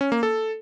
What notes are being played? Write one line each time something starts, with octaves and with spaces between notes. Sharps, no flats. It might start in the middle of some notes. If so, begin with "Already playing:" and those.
C#4
A#3
A4